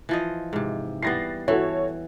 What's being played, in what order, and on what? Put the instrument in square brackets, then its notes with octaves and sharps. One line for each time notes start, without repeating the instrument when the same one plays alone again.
[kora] E3 F3 D#5
G#2 C3
[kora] E3 G3 B3 [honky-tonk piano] A6 A#6 C7
[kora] E3 [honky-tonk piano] F#4 A4 C#5